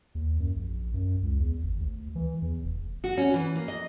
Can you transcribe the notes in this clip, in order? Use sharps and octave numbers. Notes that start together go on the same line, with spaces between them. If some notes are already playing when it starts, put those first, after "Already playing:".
D#2
F#2
A#1
F#2
C#2
E2
G#1
D2
E3
E2
F1
F#4
C#4
E3
A#3
D#5